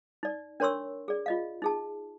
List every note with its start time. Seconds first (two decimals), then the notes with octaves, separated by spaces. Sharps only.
0.23 D#4 D5
0.60 D4 A#4 C#5 C6 C#6 E6
1.08 G#4 D5
1.26 F4 D#5 F5
1.62 D#4 G#4 A5